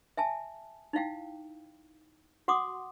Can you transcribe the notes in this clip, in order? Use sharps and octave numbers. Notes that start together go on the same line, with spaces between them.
E5 G#5 A5
D#4 E4 F5 G5
F#4 F#5 C6 D6 D#6